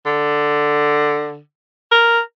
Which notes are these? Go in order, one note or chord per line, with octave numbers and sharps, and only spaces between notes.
D3
A#4